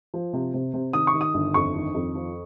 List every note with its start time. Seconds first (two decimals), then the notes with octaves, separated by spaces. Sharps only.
0.14 F3
0.33 C3
0.54 C3
0.74 C3
0.93 D#3 D#6
1.07 C#6
1.14 D#3
1.21 D#6
1.34 G1
1.54 F2 C#6
1.75 D#3
1.94 F2
2.15 F3